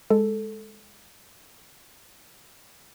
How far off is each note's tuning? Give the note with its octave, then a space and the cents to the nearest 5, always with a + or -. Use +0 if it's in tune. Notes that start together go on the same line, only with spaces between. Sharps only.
G#3 +0 A4 +0